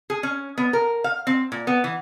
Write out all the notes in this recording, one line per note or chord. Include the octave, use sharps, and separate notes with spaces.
G#4
C#4
B3
A#4
F5
C4
A#2
B3
E3